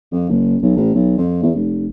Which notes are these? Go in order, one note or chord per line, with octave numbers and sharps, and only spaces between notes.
F2
F#1
B1
A1
B1
F2
E2
F1